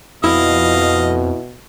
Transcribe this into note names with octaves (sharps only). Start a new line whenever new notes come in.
F2 B2 E4 D#5 F5 D#6